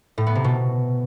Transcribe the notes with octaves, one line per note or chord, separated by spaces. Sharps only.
A2
B3
C3
B2